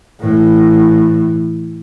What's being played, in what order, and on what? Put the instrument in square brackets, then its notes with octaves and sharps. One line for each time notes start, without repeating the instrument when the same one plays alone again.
[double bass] A2 E3